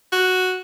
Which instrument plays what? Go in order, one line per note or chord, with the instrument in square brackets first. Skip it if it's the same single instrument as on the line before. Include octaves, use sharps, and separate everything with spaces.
[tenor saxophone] F#4